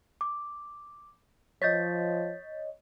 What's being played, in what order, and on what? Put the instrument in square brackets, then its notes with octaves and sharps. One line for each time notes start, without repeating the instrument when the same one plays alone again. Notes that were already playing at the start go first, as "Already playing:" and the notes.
[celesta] D6
[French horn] F3 [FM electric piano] C#5 D#5 [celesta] G6 A6 B6